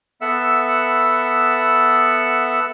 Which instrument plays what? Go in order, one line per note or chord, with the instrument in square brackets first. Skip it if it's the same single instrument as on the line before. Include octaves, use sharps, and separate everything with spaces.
[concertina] B3 A4 E5 F#5 E6